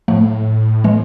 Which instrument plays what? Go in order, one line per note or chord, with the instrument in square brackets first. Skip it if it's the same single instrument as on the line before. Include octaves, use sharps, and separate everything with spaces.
[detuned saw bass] A2 [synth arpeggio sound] F3 A3
[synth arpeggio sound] E3 G#3